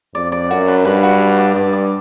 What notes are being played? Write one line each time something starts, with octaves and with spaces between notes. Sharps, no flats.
F2 D5
D5
F#2 F#4
B4
G2 B4
F#4
D5
D5
G2 D5
D6